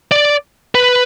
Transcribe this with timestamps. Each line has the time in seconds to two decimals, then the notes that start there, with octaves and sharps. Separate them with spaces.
0.12 D5
0.75 B4